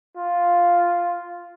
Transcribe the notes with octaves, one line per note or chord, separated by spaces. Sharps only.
F4